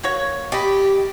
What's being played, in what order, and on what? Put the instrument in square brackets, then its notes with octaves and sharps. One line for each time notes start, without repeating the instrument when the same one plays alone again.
[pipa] A#3 F#4 C#5
[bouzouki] G4 [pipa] D5 D#5 B5